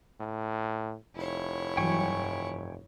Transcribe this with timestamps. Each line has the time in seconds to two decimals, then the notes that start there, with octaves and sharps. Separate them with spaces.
0.20 A2
1.15 F1 E4 C#5
1.77 G2 E3 F#3 G5 G#5 C#6